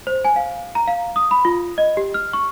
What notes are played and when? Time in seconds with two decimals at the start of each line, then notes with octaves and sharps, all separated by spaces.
0.07 C5
0.25 G#5
0.36 F5
0.75 A#5
0.88 F5
1.16 D#6
1.31 B5
1.45 F4
1.78 D#5
1.97 G4
2.14 F6
2.33 C#6